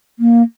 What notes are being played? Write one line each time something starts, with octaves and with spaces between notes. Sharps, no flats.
A#3